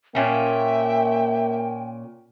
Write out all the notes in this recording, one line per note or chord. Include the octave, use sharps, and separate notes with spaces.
A#2 A#3 C#4 E5 G5